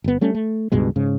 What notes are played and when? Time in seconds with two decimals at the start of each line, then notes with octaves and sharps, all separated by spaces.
0.04 G1 B3
0.21 G3 A3 C#4
0.34 A3
0.72 C#2 G2 B2 G#3
0.96 G#2 C#3